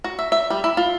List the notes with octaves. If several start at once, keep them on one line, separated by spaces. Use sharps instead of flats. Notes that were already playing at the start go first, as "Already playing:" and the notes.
F#4
E5
E5
G3
E4
F4